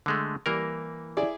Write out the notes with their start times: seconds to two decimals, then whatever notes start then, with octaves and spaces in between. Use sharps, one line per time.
0.06 D3 G#3 A3
0.46 E3 G3 A#3 A#4
1.17 E4 G#4 D5